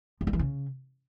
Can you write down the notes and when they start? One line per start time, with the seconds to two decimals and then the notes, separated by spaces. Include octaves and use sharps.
0.21 F#2
0.27 G3
0.33 E3
0.39 C#3